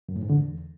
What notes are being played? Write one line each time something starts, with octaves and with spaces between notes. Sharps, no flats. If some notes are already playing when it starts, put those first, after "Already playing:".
F#2
A2
G#2
D3
E2